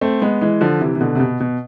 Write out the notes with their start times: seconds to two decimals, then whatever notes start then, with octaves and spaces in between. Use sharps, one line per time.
0.01 A3 C4
0.22 G#3 B3
0.41 E3 G#3
0.61 D3 F3
0.81 C3 E3
0.95 E3
1.00 B2 D3
1.15 C3
1.20 B2
1.40 B2